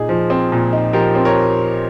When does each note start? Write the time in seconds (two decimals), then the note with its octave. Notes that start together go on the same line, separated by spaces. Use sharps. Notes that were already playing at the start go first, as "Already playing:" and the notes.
Already playing: A#2 D#4 G#4
0.09 F3
0.30 C4
0.52 A#2
0.73 D#4
0.93 F3 G4 A#4
1.15 C4
1.25 A#4 C#5